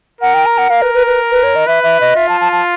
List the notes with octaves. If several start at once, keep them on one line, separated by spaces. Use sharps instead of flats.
A#4 F#5
G5
A#5
F#5
A#4 F5
B4
B4
B4
B4
C#5
D#5
B4 E5
E5
D#5
F4 E5
A5
A5
A5